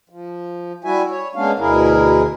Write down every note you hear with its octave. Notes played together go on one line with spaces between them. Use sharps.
F3
G3 E4 F#4 E5 G#5
C#5
G#3 A#3 B3 C#4 D4 F5
D2 B2 E4 G#4 A#4